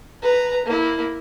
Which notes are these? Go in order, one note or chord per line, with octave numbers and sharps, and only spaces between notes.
B4 A#5
A#3 E4